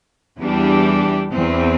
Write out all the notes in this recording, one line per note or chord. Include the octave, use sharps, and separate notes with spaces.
E2 E3 G3 D4 G4
E2 E3 C4